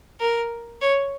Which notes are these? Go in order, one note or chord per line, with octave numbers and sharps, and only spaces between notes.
A#4
C#5